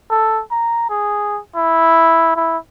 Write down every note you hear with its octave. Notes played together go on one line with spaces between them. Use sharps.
A4
A#5
G#4
E4
E4